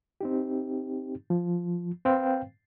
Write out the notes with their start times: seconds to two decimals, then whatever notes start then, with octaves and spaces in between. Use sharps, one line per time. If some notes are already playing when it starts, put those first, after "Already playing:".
0.21 C4 D#4 G4
1.30 F3
2.05 C4 B4 C5 F5 G5